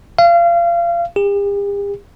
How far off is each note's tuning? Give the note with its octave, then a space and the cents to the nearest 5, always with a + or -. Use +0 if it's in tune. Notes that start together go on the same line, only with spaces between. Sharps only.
F5 -30
G4 +45